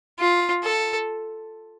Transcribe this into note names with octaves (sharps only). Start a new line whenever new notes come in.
F4
A4